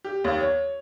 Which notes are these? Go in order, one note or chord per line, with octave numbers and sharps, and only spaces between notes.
G4
D#2
C#5